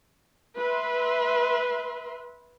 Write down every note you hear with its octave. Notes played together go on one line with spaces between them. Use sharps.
B4 E5 C6